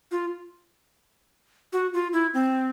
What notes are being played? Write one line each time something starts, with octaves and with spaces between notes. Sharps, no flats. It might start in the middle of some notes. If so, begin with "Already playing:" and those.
F4
F#4
F4
E4
C4